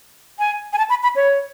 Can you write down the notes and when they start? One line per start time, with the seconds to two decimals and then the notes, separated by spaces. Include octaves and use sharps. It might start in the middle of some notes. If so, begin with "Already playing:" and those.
0.39 G#5
0.73 G#5
0.78 A5
0.90 B5
1.03 B5
1.16 C#5